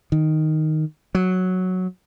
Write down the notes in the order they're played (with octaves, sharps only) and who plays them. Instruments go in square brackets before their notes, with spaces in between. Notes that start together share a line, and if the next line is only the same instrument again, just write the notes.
[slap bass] D#3
F#3